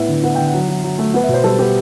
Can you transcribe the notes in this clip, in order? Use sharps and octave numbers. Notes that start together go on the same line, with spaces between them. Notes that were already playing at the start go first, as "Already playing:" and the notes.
Already playing: A2 B3 E5
D3
B3 F#5
D3 G5
F#5
F#3
F#3
F#3
A3
B3 F#5
B2 E5
C5
G3 A4
B3 G4